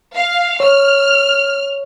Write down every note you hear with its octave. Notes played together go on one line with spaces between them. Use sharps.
F5
C#5 F6